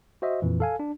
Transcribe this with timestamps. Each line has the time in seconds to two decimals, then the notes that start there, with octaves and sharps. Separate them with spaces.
0.22 F#4 C5 D#5 E5
0.42 F2 A#2 E3
0.60 A4 F5 G#5
0.80 D4